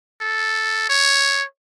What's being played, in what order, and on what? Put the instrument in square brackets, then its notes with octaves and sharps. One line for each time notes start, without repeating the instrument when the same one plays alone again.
[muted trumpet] A4
C#5